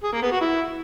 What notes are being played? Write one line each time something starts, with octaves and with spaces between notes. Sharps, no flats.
G#4
A#3
B3
F#4
E4